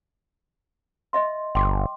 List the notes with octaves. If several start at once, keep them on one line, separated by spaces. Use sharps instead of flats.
D#5 E5 C6
G1 G5 C6 D6